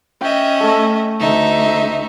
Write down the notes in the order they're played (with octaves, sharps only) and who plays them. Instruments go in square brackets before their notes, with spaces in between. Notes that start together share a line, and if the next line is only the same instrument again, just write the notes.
[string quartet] C#4 D#5 E5 [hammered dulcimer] G5
[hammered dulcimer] A3 A4
[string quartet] D2 D#4 E5